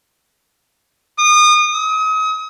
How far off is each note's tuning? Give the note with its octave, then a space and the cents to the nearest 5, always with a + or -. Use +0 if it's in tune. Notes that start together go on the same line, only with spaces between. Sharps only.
D#6 -30
D#6 +35